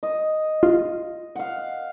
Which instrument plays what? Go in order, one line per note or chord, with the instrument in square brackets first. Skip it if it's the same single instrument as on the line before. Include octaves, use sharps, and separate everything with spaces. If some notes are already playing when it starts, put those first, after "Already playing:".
[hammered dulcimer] D#5
[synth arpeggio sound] F4
[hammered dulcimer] F5 F#5